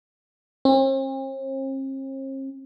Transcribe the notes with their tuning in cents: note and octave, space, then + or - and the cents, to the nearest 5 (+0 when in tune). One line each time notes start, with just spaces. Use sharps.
C4 +45